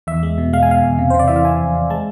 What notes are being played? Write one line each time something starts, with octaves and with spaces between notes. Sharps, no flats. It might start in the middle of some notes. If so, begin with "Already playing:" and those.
E2 E5
G#3
B2
G#3 F5
G#5
B2 F5
E2
C3
C5
C3
D5
E3 E5
F5
C3 G#5
F2
C3
G#3 A5